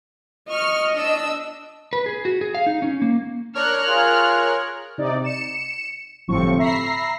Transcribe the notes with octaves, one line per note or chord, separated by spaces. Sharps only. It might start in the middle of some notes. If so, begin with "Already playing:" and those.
D#5 C#6 F6
D4 E6
B4
G#4
F#4
G#4
F5
D#4
C#4
A#3
D4 A#4 C#5 F6 F#6
F4 G#4
C3 D#4 D5
C#7 E7
G1 A2 C3 F3 C4 C#6
E5 A#5 B5 A#6 C7